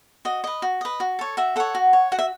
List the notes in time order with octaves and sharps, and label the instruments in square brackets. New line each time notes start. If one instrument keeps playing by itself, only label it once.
[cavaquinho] F#4 D#5
B4 D#5
F#4
B4 D#5
F#4
A4 C#5
F#4 E5
A4 C#5 F#5
F#4
C#5
F#4 F#5
E5